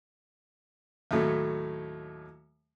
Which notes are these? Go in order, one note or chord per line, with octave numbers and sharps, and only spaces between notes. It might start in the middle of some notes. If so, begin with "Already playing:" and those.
D#2 A2 F#3 A3